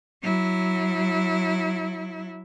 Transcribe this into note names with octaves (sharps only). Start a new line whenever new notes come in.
F#3 E4